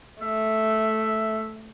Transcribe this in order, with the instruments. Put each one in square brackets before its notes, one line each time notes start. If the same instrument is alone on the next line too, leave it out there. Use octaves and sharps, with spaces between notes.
[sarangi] A3 [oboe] E5